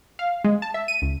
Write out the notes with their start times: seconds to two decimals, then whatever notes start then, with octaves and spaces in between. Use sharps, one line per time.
0.19 F5
0.44 G#3
0.62 A5
0.74 E5
0.88 D#7
1.02 C#2